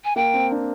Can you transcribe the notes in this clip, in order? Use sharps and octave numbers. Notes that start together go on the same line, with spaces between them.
G#5
A#3 G5
C4
D4